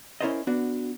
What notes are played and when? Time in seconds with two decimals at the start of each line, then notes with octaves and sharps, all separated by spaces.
0.21 C#4 E4 A#4 C5 D5 D#5
0.47 B3 D4 F#4